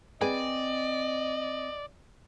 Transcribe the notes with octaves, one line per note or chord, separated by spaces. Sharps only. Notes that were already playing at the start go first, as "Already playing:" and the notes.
C4 G#4 B4 D5 D#5 G#5